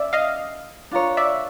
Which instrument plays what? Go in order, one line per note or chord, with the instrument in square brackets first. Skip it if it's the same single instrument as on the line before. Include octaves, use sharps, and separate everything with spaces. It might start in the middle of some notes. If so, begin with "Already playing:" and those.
Already playing: [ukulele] C#4 [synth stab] D5 E5
[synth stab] D#5 F5
[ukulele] D4 F4 A#4 C#5
[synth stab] D5 E5